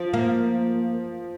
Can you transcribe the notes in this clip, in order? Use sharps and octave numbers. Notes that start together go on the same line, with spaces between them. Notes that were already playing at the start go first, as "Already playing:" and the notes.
Already playing: F3
A#3